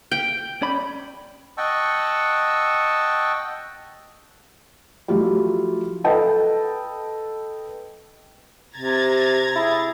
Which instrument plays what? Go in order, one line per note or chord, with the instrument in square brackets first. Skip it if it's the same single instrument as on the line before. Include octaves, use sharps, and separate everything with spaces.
[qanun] G5
[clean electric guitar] C#4 D5 B5
[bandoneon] D#5 F#5 G5 A5 C#6 E6
[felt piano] F3 F#3 A3 E4 F4 G4
A4 B4 D#5 G5 A5
[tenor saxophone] C3 [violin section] A#5 G#6 A6
[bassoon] E4 [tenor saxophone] G#4